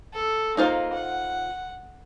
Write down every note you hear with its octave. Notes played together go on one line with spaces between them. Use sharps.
A4
A#3 D#4 F4 C5
F#5